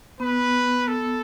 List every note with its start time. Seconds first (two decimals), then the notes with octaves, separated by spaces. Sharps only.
0.20 B3 B4
0.88 A4